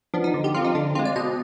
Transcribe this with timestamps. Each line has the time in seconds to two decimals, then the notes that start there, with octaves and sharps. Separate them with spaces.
0.14 F3 B3 D4
0.24 D#4
0.34 D3
0.44 G4
0.54 F3 C4 F4
0.64 D#4
0.75 D3 D4
0.95 G#3 C4 F4
1.05 D5
1.16 B2 D#5